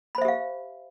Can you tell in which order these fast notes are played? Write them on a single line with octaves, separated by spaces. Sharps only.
B5 C5 E5 G4 F5